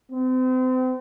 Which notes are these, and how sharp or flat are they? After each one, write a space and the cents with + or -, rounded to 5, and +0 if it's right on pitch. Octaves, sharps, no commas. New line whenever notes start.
C4 -35